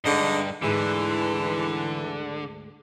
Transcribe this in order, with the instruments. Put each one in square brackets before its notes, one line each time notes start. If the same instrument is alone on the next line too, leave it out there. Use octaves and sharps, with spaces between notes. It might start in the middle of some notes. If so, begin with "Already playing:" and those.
[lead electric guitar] G2 [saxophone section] D3 G#3 D#4
[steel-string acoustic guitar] D2 G#2 G#4 [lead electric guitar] D3 [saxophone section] E3